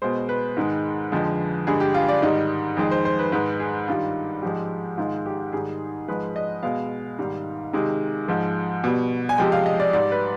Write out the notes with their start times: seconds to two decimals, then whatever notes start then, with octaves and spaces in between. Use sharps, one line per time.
0.02 B2 G#3 C5
0.29 B4
0.57 G#2 D#3 G#3
1.12 F2 D3 F3 G#3
1.67 G2 D3 G#3 G#4
1.80 G4
1.94 F4
2.09 D5
2.22 G#2 D#3 G3 D#5
2.77 F2 D#3 G#3
2.91 C5
3.05 C5
3.19 B4
3.32 G#2 D#3 G#3 B4
3.60 G#4
3.88 G2 D#3 G3 F4
4.42 G#2 F3 G#3 G4
4.97 G#2 D#3 G#3 F4
5.26 G4
5.53 G#2 D#3 G3 G#4
6.08 G#2 F3 G#3 B4
6.36 D#5
6.63 B2 G#3 F5
7.19 G#2 D#3 G3
7.73 C3 D#3 G#3
8.28 G#2 F3 G#3
8.84 B2 G3
9.29 G#5
9.38 C3 F3 G#3 G5
9.52 F5
9.66 D#5
9.80 D5
9.93 G#2 G3 D5
10.12 B4